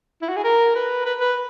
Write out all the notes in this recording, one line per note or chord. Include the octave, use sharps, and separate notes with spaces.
E4
F#4
G#4
A#4
B4
B4
B4